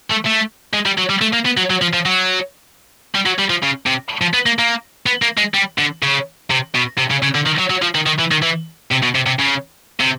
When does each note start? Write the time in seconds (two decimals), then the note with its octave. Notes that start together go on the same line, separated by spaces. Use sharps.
0.10 A3
0.25 A3
0.73 G#3
0.86 G3
0.98 F#3
1.09 G3
1.21 A3
1.33 A#3
1.45 B3
1.57 F#3
1.70 F#3
1.82 F3
1.93 F3
2.06 F#3
3.15 G3
3.26 F#3
3.38 G3
3.50 F3
3.63 C#3
3.86 C3
4.22 F3
4.34 B3
4.46 A#3
4.58 A#3
5.06 B3
5.22 A#3
5.38 G#3
5.54 G3
5.78 D3
6.03 C#3
6.50 C3
6.75 B2
6.98 C3
7.11 C#3
7.22 C#3
7.35 D3
7.46 D#3
7.59 F#3
7.70 F#3
7.82 F3
7.95 D#3
8.06 D#3
8.19 E3
8.31 D#3
8.42 E3
8.91 C3
9.02 B2
9.15 C3
9.26 C3
9.39 C#3
10.00 C3